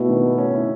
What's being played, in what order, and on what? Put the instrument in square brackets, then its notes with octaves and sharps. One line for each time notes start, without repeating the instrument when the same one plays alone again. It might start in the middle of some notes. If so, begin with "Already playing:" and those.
Already playing: [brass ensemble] B2 [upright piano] A3 E4
[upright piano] D#3
A3
C#4
E4